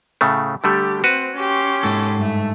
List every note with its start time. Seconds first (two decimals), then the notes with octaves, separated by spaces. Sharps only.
0.21 A2 C#3 A3
0.64 D3 G3 A3 G4
1.04 C4 F#4 B4
1.36 C#4 G4 C6
1.83 G#2 A4
2.17 G2 A3